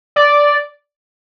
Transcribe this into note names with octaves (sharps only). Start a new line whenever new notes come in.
D5